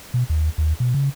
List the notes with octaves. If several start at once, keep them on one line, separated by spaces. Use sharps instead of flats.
B2
D#2
D#2
B2
C#3